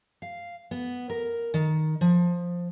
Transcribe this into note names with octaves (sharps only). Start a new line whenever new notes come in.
F5
B3
A#4
D#3
F3